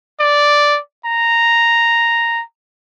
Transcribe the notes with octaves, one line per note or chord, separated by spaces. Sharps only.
D5
A#5